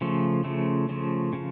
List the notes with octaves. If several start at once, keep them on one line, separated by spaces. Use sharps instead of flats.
C#3 F3 A3
C#3 F3 A3
C#3 F3 A3
C#3 F3